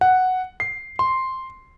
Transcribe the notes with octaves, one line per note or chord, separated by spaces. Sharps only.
F#5
C7
C6